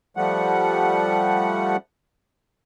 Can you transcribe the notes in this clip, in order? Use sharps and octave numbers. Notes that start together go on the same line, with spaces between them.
F3 G3 A3 F#5